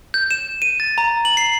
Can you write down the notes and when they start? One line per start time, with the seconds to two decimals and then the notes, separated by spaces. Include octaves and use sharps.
0.14 G6
0.31 E7
0.62 D#7
0.80 A6
0.98 A#5
1.25 F#7
1.37 C7